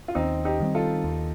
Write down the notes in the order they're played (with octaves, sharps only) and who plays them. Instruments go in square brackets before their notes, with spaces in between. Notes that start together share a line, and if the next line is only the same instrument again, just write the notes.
[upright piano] F4
[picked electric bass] D#2 [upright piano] C4 D#4
[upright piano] D#4 G4
[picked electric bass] D#3 G3 C4
[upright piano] F4 A4
[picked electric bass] D#2